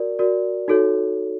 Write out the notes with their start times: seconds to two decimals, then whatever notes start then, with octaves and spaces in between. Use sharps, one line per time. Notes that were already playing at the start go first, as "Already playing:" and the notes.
Already playing: F#4 A#4 D5
0.19 F#4 A#4 D5
0.68 D#4 F#4 A4 C#5